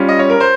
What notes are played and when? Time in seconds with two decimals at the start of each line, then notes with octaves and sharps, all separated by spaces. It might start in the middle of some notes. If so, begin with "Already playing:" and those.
Already playing: G3 C#4 F4
0.08 D#5
0.19 C#5
0.30 A#4
0.40 C5